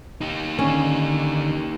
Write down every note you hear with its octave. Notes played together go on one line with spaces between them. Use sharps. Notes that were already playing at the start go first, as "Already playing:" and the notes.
D#4 G4
D3 D#3 C#4